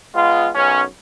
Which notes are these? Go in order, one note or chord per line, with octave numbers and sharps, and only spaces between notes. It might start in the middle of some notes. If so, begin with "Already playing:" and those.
G#3 B3 F4
B1 F#2 C#4